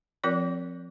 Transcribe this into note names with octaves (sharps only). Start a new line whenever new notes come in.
F3 C4 F4 A#4 D5